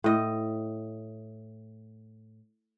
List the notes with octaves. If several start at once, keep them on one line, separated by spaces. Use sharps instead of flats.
A2 D#5